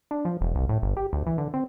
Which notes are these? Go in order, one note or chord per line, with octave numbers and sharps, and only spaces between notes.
D4
F3
E1
C2
A2
G1
G4
D2
E3
D3
C4